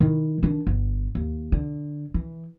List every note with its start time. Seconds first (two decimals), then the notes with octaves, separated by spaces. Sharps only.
0.01 D#3 E4
0.43 D#3 D4
0.67 G1
1.15 D#2
1.52 D3
2.14 E3